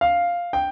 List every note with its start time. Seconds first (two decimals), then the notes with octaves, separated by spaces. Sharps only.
0.01 F5
0.53 G5